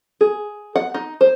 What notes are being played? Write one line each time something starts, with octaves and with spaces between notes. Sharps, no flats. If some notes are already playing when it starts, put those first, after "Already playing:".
G#4
F#5
D#4
C5